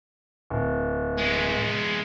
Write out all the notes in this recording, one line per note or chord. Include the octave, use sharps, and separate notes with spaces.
D1
G#3 B3